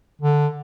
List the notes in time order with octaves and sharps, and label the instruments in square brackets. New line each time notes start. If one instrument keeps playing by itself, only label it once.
[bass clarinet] D3